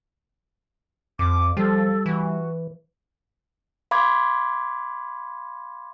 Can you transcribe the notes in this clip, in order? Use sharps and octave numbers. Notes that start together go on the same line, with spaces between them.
F2 D6
F3 G3 G4 A4
E3 F#4
F5 B5 C6 D6 G#6